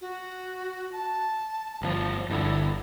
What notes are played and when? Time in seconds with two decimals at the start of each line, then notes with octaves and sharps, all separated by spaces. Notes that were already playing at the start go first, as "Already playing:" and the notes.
0.01 F#4
0.92 A5
1.82 G1 B2 F3
2.30 G1 B2 D3 E4